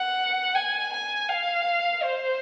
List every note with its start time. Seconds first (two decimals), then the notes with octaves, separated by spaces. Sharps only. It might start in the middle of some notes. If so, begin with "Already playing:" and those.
Already playing: F#5
0.55 G#5
0.93 G#5
1.29 F5
2.03 C5